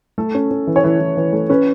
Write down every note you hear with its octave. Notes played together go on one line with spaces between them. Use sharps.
A3 A4
C#4
C#4
E3
C#5
E3 B4
E3
E3
A3
C#4 B4